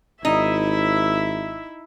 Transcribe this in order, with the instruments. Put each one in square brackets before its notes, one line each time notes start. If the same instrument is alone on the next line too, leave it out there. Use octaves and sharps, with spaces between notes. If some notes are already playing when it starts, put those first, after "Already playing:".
[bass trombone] G#1 [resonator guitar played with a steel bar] D#4 [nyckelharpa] E4 E5